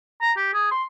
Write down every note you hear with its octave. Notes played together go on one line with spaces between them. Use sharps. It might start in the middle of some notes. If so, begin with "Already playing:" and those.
A#5
G4
G#4
C6